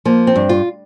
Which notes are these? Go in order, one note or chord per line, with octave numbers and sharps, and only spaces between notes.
F3 A#3
C4
G2
F4